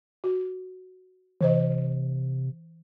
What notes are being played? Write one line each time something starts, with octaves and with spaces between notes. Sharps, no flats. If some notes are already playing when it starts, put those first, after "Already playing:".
F#4
C3 E3 C5 D#5